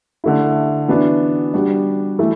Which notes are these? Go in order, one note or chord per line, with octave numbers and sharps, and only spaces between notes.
D3 A3 E4
E3 B3 D4 F#4
G3 D4 F#4
E3 A3 E4